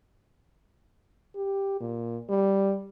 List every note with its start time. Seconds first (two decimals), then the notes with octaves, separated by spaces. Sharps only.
1.36 G4
1.80 A#2
2.29 G3